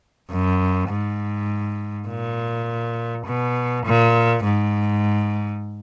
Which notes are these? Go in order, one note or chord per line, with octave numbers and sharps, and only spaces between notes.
F#2
G#2
A#2
B2
A#2
G#2